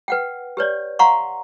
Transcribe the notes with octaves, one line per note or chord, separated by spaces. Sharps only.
B4 F#5 G5
G4 B4 C#5 D5
F5 F#5 A#5 C6 C#6